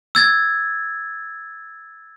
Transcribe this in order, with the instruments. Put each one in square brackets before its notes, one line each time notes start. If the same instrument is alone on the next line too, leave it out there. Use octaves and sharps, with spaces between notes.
[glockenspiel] E6 G#6 A6